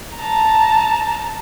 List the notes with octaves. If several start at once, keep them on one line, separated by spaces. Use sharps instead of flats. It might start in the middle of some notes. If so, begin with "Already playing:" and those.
A5 A#5